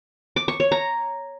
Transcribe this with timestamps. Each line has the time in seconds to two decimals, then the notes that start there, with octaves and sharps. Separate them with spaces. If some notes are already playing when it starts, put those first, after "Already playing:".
0.36 D6
0.48 C#6
0.60 C#5
0.72 A#5